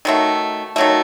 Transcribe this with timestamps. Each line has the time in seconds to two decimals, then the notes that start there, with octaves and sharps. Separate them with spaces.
0.05 D#3 F#3 A3
0.76 D#3 F#3 A3